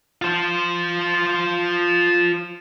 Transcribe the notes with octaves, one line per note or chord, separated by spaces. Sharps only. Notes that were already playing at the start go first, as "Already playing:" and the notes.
F4 C5